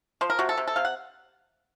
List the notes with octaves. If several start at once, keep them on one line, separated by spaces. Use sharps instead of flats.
F3 C5
A#4
C3 F#4
A4
C3
A4
C3 F5
F#5